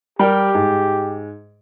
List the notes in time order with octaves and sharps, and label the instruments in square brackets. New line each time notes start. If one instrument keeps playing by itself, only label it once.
[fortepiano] G3 A#4 G5 [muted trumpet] G4
[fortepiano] G#2